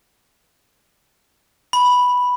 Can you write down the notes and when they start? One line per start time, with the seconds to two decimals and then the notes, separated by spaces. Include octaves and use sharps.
1.73 B5